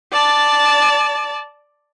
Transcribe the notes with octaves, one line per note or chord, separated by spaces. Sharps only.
D5 A5